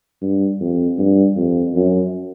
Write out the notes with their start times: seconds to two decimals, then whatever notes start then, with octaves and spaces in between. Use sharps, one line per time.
0.21 G2
0.60 F2
0.98 G2
1.36 F2
1.75 F#2